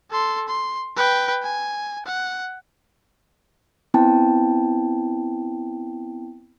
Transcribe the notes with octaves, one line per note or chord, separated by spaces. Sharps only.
A4 C6
C6
B4 G5
G#5
F#5
B3 C4 E4 G5 A5